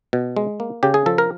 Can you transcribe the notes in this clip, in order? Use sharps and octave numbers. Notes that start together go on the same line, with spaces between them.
B2
G#3
A#3
C#3 G4
G#4
F3 A4
A#4